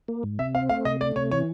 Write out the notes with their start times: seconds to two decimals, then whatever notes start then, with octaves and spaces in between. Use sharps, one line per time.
0.08 A#3
0.23 G#2
0.39 C3 E5
0.55 C4 F5
0.69 A3 F5
0.85 C3 D#5
1.01 A3 D5
1.16 C3 C#5
1.31 E3 C#5